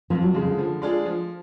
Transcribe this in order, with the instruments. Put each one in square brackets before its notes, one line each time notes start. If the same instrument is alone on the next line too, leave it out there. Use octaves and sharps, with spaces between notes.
[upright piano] F2 [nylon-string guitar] F3
[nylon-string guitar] F#3
[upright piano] C#3 G#3 [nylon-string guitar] F3
[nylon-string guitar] D3
[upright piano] F3
G#3 D4 F4 G#4
F3